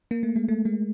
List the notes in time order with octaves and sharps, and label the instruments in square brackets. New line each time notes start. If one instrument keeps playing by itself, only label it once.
[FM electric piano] A#3
A3
G#3
A3
G#3